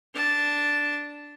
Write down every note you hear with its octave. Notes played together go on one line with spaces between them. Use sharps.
D4 A5